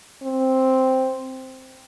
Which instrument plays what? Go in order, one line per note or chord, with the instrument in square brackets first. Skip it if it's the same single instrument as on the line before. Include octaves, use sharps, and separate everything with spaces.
[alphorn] C4